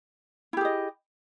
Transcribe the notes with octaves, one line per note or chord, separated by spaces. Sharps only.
E4 G4 G#4 D#5